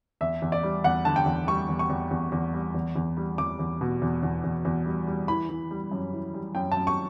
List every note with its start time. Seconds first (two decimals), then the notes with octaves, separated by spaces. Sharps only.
0.21 E2 E5
0.42 E2
0.52 D5
0.63 G3
0.84 E2 F#5
1.05 D3 A5
1.16 G5
1.26 E2
1.47 G3 C#6
1.69 E2
1.79 C#6
1.90 E2
2.11 E2
2.32 E2
2.54 G3
2.75 E2
2.96 E2
3.17 G3
3.38 E2 D6
3.59 E2
3.81 B2
4.02 E2
4.23 E2
4.44 E2
4.65 E2
4.86 G3
5.07 G3
5.28 E3 B5
5.49 E3
5.71 G3
5.91 F#2
6.13 E3
6.34 G3
6.55 F#2 G5
6.72 A5
6.77 F#2
6.87 C#6